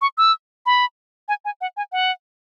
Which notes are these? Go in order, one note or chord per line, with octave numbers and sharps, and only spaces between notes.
C#6
E6
B5
G#5
G#5
F#5
G#5
F#5